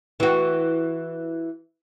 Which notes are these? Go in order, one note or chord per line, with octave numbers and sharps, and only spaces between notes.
E3 F#4